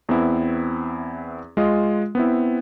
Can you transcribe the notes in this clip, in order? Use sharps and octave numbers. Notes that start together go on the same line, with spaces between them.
E2 B3 C4 E4
G#3 F4 D#5
B3 C4 E4